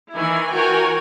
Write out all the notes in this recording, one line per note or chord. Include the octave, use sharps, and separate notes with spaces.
D#3 E3 E4 G#5
E3 F#4 A#4 C#5 G5 G#5